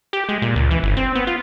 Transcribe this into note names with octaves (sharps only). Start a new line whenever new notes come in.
G4
G#3
A#2
C#2
E3
G1
C4
B3
F4